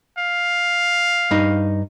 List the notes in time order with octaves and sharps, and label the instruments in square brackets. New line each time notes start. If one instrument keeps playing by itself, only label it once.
[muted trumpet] F5
[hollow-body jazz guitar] G2 D#4